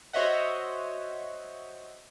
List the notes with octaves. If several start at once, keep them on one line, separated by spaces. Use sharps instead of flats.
F#4 C5 C#5 D#5 E5 F#5